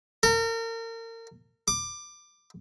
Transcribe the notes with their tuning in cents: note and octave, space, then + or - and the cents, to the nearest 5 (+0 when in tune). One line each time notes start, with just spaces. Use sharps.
A#4 -35
D6 +15